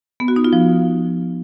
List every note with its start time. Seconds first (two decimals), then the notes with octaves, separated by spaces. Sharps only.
0.20 B3
0.28 F#4
0.36 D#4
0.44 F4
0.53 F3